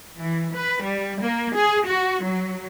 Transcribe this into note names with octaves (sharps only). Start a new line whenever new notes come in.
E3
B4
G3
A#3
G#4
F#4
F#3